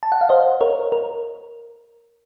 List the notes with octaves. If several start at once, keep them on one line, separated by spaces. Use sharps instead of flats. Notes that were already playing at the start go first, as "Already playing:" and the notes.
A5
F#5
F5
C5 D#5
A#4 C#5
A#4